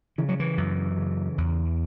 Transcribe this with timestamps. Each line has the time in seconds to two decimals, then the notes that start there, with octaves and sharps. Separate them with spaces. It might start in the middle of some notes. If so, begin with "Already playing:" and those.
0.18 C#3 E3
0.29 F#3
0.40 E3
0.57 F#2
0.98 C#3
1.38 E2